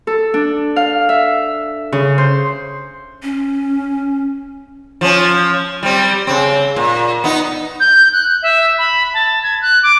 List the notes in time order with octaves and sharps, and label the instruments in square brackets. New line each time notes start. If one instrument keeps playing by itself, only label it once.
[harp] A4
D4
F5
E5
C#3
C5
[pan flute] C#4
[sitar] F3 C#4
G3 C4
C#3 C4
A#2
B3 D#4
[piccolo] G6
F#6
E5
B5
A5
G#6
F#6
D6